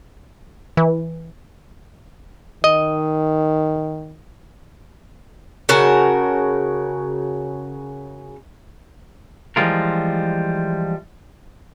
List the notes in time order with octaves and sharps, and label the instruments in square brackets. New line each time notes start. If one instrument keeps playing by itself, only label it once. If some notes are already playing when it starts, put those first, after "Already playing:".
[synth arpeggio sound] E3
[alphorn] D#3 [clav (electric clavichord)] D#5
[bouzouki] C#3 F#4 A#4 A5
[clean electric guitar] E3 F3 G3 G#3 F4 A#4